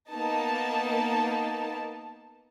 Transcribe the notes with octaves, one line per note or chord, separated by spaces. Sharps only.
A#3 B3 D#4 A5